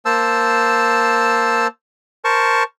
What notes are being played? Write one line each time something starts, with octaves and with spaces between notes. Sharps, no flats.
A#3 C5 A5 E6
A#4 C5 A5 C#6